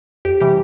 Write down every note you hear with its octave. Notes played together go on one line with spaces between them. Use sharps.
F2 G4
C3 E3 G3 G4